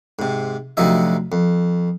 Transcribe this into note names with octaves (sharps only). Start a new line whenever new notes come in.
G#2 C3
D2 C3 F3 F#3 D#4 E5
F2